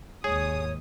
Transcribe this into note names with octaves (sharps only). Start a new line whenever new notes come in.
D#2 G#2 G#4 C#5 D#6